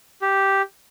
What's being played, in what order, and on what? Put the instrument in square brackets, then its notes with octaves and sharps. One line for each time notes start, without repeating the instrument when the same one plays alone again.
[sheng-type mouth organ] G4